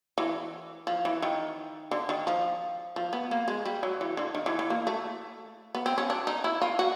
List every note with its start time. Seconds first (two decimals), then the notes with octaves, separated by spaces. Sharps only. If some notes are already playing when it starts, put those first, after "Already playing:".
0.18 E3
0.87 F3
1.05 E3
1.22 D#3
1.91 D3
2.09 D#3
2.27 F3
2.96 F3
3.13 B3
3.31 A#3
3.48 G#3
3.65 G3
3.83 F#3
4.01 E3
4.17 D3
4.35 D#3
4.46 E3
4.59 E3
4.70 A#3
4.87 A3
5.75 B3
5.86 C4
5.98 C#4
6.10 D4
6.27 D#4
6.44 E4
6.62 F4
6.79 F#4